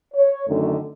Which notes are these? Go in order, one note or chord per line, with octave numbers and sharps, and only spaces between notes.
C#5
F#2 D3 D#3 A3